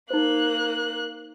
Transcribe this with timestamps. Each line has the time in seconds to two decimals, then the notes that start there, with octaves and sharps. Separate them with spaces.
0.10 A#3 D#4 C5 F#6